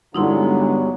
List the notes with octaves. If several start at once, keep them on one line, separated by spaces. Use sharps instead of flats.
G2 D3 F#3 G#3 B3 D#4 E4 C6